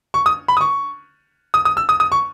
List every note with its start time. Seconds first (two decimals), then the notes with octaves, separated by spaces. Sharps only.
0.14 C#6
0.26 D#6
0.48 B5
0.57 D#6
0.61 C#6
1.54 D#6
1.65 D#6
1.77 E6
1.89 D#6
2.00 D#6
2.12 C#6